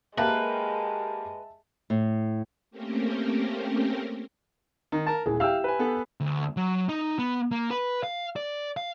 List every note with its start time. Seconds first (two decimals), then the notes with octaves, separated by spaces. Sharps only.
0.17 G#3 A#3 G4 A#4 B4 E5 A5
1.90 A2
2.71 A3 A#3 C4 C#4 G4 A#4
4.92 D#3
5.06 A#4 A5
5.26 D#1 E3 G#4
5.40 G4 E5 F5 G5 E6
5.64 B4 G#5
5.79 B3 A4
6.20 D2
6.57 F#3
6.89 D#4
7.19 B3
7.51 A#3
7.70 B4
8.03 F5
8.36 D5
8.77 F5